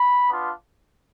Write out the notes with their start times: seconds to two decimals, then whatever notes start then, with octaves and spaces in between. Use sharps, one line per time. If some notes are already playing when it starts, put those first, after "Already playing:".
Already playing: B5
0.29 B3 D4 F4